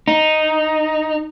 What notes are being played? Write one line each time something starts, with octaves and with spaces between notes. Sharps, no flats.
D#4